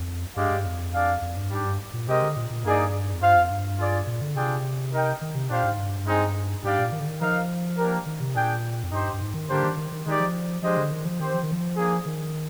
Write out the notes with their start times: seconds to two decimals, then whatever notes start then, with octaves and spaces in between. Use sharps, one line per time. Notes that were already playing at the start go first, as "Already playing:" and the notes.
Already playing: F2
0.36 G2 G#3 D4 G4 D5 F5
0.51 G2
0.66 F2
0.94 D4 G#4 D5 F5
1.22 F2
1.37 G2
1.50 G#2 G3 D4 G4
1.65 G2
1.93 A#2
2.08 C3 G#3 C4 G4 A#4 D#5
2.22 D3
2.36 A#2
2.50 A#2
2.64 G2 A#3 D#4 G#4 D5
3.13 F2
3.22 G2 F4 C5 F5
3.35 F2
3.51 G2
3.79 F4 G#4 D5
4.07 A#2
4.22 D3
4.36 C3 D4 F4 G#4 D5 G5
4.93 D#4 A#4 D#5 G5
5.21 D#3
5.35 C3
5.50 A#2 D4 G4 C5 F5
5.64 G#2
5.78 G2
6.06 G#3 C4 D#4 G#4
6.63 G#2 G3 D4 G4 D5 F5
6.78 A#2
6.92 D#3
6.99 D3
7.07 D#3
7.21 F3 D#4 A#4 F5
7.78 A#3 D4 G4 A#4
8.06 D#3
8.20 C3
8.35 A#2 D4 G#4 D5 G5
8.84 F2
8.92 G2 D#4 G4 C5
9.13 G2
9.21 G#2
9.34 D#3
9.49 D3 G3 A#3 D4 G4 C5
9.63 D#3
9.77 D#3
9.92 D#3
10.06 D#3 G#3 D#4 G4 D5
10.20 F3
10.62 F3 G#3 D4 G4 C5 D#5
10.77 D3
10.91 D#3
11.05 F3
11.19 D#3 C4 G4 C5
11.34 F3
11.43 D#3
11.51 F3
11.77 A#3 D4 G#4
12.06 D#3